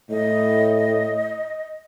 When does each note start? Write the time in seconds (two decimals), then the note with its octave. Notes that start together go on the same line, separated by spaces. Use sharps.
0.10 A2 D#5